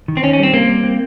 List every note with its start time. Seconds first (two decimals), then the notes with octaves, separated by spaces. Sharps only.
0.08 D#3
0.17 C4
0.23 D#3 C#4
0.33 C#4
0.39 G3 C4
0.53 A#3 C4
0.69 G3
0.83 C4